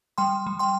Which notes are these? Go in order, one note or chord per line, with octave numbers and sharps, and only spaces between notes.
G3 G5 C6
G3
G5 C6